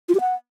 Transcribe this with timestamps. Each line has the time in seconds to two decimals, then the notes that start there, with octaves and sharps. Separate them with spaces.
0.09 F4
0.15 G4
0.20 F#5